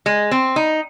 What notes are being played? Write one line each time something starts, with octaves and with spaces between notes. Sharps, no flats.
G#3
C4
D#4